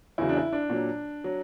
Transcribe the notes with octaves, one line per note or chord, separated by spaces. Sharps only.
E2 C#3 F#3 E4
D4
E4
D4
A#2 F#3
F#3